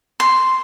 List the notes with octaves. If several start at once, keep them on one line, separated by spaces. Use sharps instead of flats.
C6